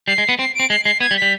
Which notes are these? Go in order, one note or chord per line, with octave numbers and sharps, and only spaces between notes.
G3 C7
G#3
B3
C4 C7
C4 D7
G#3 C7
G#3 C7
B3 G#6
G3
B6
G3